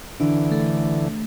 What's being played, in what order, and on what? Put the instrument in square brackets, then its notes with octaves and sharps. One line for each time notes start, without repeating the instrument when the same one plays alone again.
[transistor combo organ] D3 E3 [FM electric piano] D4
[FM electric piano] A3